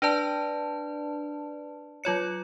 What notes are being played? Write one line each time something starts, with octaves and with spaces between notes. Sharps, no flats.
D4 B4 D5 A5
F#3 F4 C#5 C#7